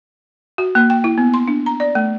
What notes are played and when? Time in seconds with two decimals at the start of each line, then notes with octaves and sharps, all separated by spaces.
0.58 F#4
0.75 A#3
0.90 G5
1.04 E4
1.18 B3
1.34 C6
1.48 D4
1.66 A#5
1.80 D5
1.95 A3